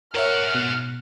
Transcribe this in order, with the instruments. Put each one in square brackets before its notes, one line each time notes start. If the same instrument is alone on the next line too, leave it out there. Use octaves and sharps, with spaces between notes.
[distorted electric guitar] G#2 F#5 [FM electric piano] A#4 C#5 E5 [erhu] F6
[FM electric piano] B2 F#6